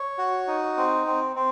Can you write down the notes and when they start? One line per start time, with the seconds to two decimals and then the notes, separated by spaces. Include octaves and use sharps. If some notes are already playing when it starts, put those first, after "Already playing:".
Already playing: C#5
0.18 F#4
0.47 D#4
0.77 C4
1.07 C4
1.36 C4